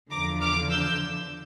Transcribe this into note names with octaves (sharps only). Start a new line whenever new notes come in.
E2 D3 F3 A#5 D6
D6 F6
E6 G6